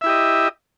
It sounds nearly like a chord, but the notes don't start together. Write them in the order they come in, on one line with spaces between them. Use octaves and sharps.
E5 E4 G4 D#5